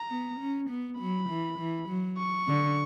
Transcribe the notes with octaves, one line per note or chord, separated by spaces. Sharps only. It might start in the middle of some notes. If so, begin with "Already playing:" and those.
Already playing: A#5
B3
C#4
B3
F#3 B5
E3
E3
F#3
C#6
D3